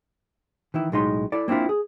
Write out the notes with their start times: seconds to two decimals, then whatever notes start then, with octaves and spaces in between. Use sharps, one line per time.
0.74 D#3 E3 E4
0.92 B1 A2 G#3 D#4 D#5 C6
1.32 E4 A4 D5
1.48 A#3 C4 D4 E4 F4
1.69 G#4